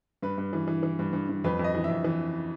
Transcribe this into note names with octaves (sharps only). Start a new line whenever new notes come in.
G2 B4
G2
E3
E3
E3
G2
G2
G2
F2 B4
F2
D#5
E3
E5
F2
E3